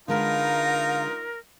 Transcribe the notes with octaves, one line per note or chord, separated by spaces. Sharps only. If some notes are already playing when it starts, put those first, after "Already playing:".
D3 G#3 D#4 F4 A#4 B4 F5 A#5